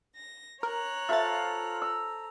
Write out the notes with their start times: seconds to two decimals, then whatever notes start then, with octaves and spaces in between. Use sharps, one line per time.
0.13 A#6
0.63 A#4 C#5 A#5 F#6
1.09 F4 A4 C5 E5 A6
1.82 A#5 E6